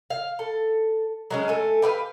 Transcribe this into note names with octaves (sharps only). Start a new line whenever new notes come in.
F5
A4
F#3 G#3 C#4
A3 A4 G#5
G4 B4 E5 F5